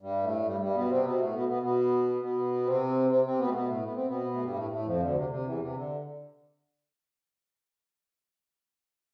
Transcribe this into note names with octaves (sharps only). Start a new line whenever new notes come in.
G2 G3
A2 A3
G2 G3
G2 G3
B2 B3
C3 C4
B2 B3
A2 A3
B2 B3
B2 B3
B2 B3
B2 B3
C3 C4
C3 C4
C3 C4
B2 B3
A3
B2 B3
A2 A3
B3
C4
B2 B3
A3
G2 G3
A2 A3
A2 A3
F2 F3
D2 D3
C3
C3
E2 E3
C3
D3